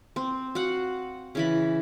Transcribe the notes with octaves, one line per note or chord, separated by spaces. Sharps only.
C4
F#4 F5 F#5
C#3 E3 B5